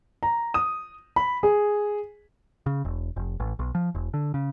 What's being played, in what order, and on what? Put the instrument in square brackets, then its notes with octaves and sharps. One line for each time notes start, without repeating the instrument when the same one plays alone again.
[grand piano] A#5
D#6
B5
G#4
[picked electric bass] C#3
E1
F1
A1
B1
F3
E1
D3
C#3